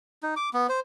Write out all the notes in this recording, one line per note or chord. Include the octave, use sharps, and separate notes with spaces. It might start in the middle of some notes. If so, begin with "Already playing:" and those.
D#4
D6
B3
C5